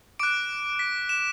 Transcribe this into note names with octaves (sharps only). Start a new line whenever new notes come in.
D6 F#6 D7
B6
E7